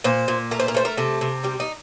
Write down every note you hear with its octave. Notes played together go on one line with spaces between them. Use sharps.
A#2 C5
A#2
A3 A#4
C5
A#4
A3 C5
A#4
C3 A4
C3
G3 G4
D#4